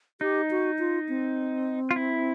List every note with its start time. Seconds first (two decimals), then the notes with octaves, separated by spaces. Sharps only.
0.21 D#4 G4
0.51 F#4
0.79 F4
1.09 C4
1.91 F4
1.96 E4